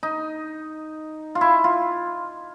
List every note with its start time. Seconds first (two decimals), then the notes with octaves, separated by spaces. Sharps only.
0.03 D#4
1.35 F4
1.41 E4
1.64 F4